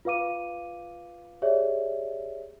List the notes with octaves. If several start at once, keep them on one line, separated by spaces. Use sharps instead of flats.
F4 B4 F5 D6 D#7
G4 G#4 C#5 D5 E5